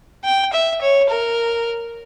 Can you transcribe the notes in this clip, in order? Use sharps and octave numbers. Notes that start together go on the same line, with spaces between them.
G5
E5
C#5
A#4